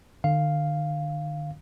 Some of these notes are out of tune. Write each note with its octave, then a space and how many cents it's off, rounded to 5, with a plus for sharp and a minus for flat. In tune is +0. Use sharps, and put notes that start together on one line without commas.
D3 +40 F5 +0